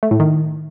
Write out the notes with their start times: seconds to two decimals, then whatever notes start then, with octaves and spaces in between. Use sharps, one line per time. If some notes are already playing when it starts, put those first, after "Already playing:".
0.03 A3
0.11 A2
0.20 D#3